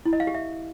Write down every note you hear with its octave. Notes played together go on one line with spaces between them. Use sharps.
E4
D#5
F5
G4
E5